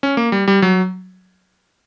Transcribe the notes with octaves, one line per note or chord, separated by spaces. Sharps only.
C#4
A#3
G3
G3
F#3